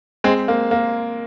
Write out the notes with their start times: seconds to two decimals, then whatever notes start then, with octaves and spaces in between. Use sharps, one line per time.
0.24 G#3 C4
0.48 A#3
0.71 A#3